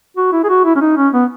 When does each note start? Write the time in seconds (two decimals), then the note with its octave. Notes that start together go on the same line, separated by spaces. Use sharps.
0.17 F#4
0.33 E4
0.44 G#4
0.49 F#4
0.65 E4
0.76 C#4
0.81 D#4
0.97 C#4
1.13 B3